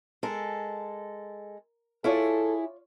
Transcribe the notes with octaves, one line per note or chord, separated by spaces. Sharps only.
G#3 A4 A#4
E4 F4 G#4 A4 C#5 D5